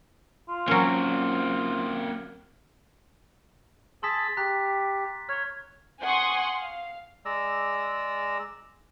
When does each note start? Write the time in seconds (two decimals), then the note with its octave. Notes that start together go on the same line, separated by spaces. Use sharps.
0.49 F4
0.68 F#3 A#3 C4 C#4
4.03 G#4 A5 C6 E6 A6 B6
4.37 G4 A#5 F#6 B6
5.29 C#5 C#6 F6
6.03 F#5 G#5 C6 C#6 D#6
6.55 F5
7.25 G#3 D5 A#5 E6